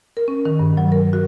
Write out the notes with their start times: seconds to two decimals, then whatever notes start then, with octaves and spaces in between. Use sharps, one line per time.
0.17 A#4
0.28 C#4
0.45 D#3
0.59 G2
0.77 F#3
0.92 A#4
1.13 F#4